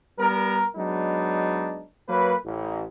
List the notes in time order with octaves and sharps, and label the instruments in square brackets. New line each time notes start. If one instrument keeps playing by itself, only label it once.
[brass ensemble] G3 B3 A#4
F#3 G#3 B3 D4 D#4
F#3 A#3 B4
A1